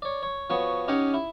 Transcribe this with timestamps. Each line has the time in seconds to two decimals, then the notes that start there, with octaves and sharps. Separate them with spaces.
0.02 C#5 D5
0.23 C#5
0.50 F3 B3 F#4 C#5
0.88 C#4 D#4 G4 D#5 F#5 G#5
1.14 E4